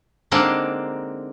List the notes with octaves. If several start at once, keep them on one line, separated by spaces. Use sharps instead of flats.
D3 G#3 A#3 C4 D4 D#4